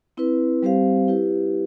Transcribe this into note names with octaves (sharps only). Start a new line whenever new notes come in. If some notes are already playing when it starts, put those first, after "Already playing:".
C4 E4 B4
G3 C4 G4 C5 F5
E4 G4 B4